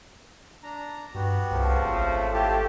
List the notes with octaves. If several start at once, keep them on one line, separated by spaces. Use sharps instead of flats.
D4 A#5
G2 B3 F#4 G4
C2 C#3 F3 A3
G#1 C4 C5
A3 E4 F4 G4 A5